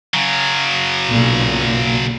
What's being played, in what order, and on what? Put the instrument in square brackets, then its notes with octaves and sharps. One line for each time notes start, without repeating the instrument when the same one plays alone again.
[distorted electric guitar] C#3 F#3
[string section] B1 A#2